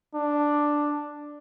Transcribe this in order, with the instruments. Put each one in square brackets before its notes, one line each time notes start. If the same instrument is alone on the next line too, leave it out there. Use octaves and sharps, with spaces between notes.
[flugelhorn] D4